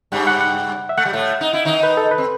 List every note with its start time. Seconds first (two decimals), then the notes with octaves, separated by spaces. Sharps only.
0.12 G2 G3 F#5
0.27 F#5
0.41 F#5
0.89 E5
0.97 A3 F#5
1.05 G3
1.13 A2 A3
1.41 D#4
1.53 E4
1.65 D#3 D#4
1.83 B4
1.97 A4
2.11 B4
2.18 C4